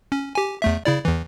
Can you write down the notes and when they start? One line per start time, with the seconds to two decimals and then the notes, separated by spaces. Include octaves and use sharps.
0.12 C#4
0.35 G4 G#5
0.62 E2 A3 E5
0.85 C#3 E4 D5
1.05 E2 E3